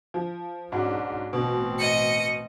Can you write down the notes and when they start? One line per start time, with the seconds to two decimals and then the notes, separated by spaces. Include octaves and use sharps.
0.14 F3
0.72 G#2 C#4 D4 F#4
1.33 A1 B2 C4
1.78 D#5 C#7